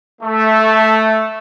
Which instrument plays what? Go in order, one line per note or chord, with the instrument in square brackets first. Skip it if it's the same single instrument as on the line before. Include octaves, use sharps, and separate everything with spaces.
[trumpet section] A3